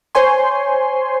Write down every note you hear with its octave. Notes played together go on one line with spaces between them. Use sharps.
C5 C#5 G#5 C6